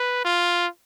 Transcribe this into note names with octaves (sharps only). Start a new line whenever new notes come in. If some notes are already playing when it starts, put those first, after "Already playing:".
Already playing: B4
F4